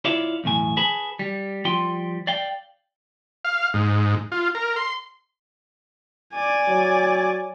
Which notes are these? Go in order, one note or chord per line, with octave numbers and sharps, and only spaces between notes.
E4 F4 C#5 D5 E5 F5
B1 E2 A2 G#5
G#4 B4 G#5 A5 B5
G3
F3 G3 F4 G5 C6
D5 F5 G5
F5
G#2
F4
A#4
C6
D5 G#5
F#3